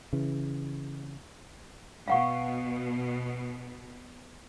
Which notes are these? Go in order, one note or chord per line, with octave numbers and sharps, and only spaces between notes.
C#3 E3
B2 F5 F#5 C#6